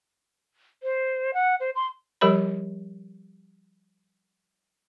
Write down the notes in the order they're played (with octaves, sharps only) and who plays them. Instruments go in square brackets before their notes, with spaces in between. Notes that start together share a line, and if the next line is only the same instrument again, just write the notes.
[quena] C5
F#5
C5
C6
[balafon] F3 G3 G4 A#4 C#5 B5